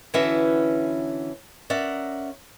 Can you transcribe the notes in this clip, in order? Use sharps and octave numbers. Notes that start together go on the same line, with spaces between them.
D3 E3 C#4 F#4 B4 E5
C#4 A#4 D5 E5 F#5